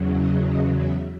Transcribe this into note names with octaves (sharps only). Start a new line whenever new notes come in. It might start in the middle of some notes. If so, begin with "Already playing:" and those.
Already playing: E2 C#3 F#3
D#5
D#5
E5